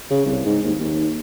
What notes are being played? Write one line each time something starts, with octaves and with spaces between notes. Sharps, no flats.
C#3
C2
G#2
D#2
D#2